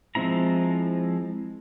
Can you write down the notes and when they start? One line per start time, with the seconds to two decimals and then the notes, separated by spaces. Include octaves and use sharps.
0.15 F3 G#3 C4 E4 A#5